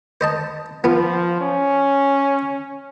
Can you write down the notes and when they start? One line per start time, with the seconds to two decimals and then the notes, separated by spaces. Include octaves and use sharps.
0.21 C5 D#5 A5
0.84 F3 B3 F4
1.41 C#4